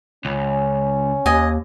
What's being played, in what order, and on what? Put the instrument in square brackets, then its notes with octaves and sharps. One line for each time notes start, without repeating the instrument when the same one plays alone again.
[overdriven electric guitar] C#2 [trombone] C#4
[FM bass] D#2 [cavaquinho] D#5 G#5